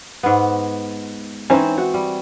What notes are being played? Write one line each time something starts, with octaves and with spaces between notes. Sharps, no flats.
G#2 B3
E3 C4 C#4 D#4 C5
F#4
G3